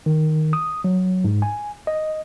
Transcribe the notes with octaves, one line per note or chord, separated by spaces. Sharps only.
D#3
D#6
F#3
G#2
G#5
D#5